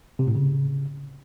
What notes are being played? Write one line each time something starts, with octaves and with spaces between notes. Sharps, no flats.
C3
A2
C#3